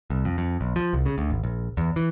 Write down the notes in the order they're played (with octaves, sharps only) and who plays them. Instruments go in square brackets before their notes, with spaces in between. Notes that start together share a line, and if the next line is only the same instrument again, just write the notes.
[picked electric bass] C2
F2
F2
B1
F3
C2
C#3
D2
G#1
A#1
E2
E3